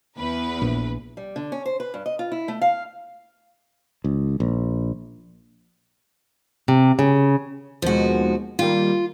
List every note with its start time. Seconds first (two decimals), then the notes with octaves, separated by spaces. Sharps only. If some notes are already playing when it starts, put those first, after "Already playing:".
0.18 E2 B4
0.62 A#1
1.17 G3
1.36 D3
1.52 C#4
1.66 C5
1.80 B4
1.94 G2
2.06 D#5
2.19 F4
2.32 E4
2.48 A3
2.62 F5
4.04 C#2
4.40 A#1
6.68 C3
6.99 C#3
7.82 D#2 B2 F3 G#3 F#4
8.59 D#3 G3 A#3 F4